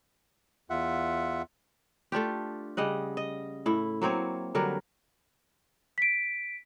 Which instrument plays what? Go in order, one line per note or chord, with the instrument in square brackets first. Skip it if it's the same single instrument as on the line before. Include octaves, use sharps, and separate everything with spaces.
[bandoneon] E2 F4 E5 F#5
[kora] A3 D4 F4 G4
C#3 G3 D#5 F#5
D#5
A2 E4
F#3 A#3 C4 C#5
D3 F#3 G3 A#4
[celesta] B6 D7